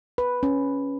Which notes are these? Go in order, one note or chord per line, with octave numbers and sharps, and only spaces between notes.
B4
C#4